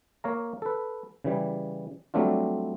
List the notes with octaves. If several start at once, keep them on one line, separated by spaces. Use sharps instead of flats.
A#3 C#5 F5 A#5
A4 B4
C#3 E3 G3
F#3 G3 A3 C4 D4 F4